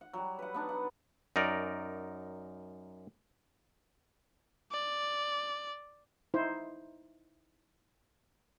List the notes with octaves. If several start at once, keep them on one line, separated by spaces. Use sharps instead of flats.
F#5
F#3 G3
B4 F#5
B3 D4 D#4
F#5
F#2 D#4 A#4 D5
D5
D#4 E4 C5